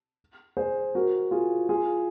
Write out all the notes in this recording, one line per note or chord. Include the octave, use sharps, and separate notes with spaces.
G#4 C5
F#4 A#4
F4 G#4
F4 G#4